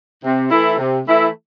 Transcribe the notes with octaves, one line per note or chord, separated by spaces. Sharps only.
C3
E3 A3 E4
C3
E3 A3 E4